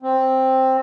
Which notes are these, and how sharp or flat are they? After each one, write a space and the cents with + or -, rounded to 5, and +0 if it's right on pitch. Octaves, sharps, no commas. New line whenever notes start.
C4 +5